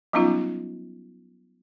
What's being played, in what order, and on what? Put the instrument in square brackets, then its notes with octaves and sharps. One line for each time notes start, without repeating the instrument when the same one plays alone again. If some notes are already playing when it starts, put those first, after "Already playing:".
[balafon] F#3 G3 B3 C#4 D#4 F4